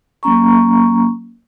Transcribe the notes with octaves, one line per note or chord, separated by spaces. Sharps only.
F#3 A#3 C#4 A#5 C#6